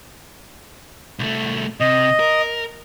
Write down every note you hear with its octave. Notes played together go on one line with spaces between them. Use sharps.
C2 A3
C3 D#5
A#4